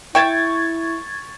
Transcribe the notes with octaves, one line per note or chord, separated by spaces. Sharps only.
E4 E5 G5 C#6 G#6 A6